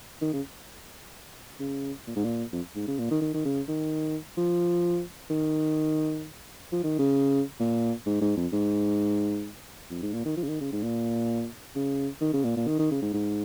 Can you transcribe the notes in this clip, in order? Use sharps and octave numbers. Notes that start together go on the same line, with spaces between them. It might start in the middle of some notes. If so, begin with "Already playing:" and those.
D#3
C#3
C#3
A#2
G#2
A#2
F2
G#2
C#3
A#2
D#3
D#3
D#3
C#3
D#3
F3
D#3
F3
D#3
C#3
A#2
G#2
G#2
F2
G#2
F2
G#2
A#2
D#3
F3
C#3
D#3
C#3
G#2
A#2
C#3
D#3
C#3
A#2
A#2
D#3
D#3
C#3
G#2
G#2